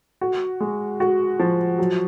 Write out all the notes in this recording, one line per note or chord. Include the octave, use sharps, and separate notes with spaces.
F#4
G#3
F#4
F3
F#3